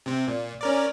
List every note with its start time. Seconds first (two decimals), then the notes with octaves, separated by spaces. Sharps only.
0.06 C3 C4
0.28 A#2
0.61 C#4 A#4 D5